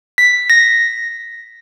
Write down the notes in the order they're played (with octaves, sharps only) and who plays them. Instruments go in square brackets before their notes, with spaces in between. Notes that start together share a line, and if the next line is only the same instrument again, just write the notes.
[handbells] B6
A#6